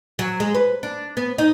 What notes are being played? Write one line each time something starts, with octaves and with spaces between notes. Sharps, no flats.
F#3
G#3
B4
D4
B3
D#4